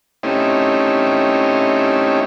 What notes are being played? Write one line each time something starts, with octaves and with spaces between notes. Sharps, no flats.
A3 C4 C#4 D#4 E4 G4